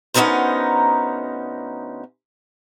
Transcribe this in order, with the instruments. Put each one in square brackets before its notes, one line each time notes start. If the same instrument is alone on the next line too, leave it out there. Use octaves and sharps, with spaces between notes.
[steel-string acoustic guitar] D2 B3 C#4 D#4 A#4 C5